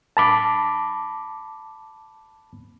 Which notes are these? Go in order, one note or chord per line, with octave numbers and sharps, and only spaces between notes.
A5 B5 D6